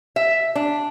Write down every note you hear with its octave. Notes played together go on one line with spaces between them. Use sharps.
E5
D4